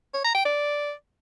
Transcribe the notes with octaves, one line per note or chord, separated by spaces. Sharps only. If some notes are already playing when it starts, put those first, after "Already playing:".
C#5
A#5
G5
D5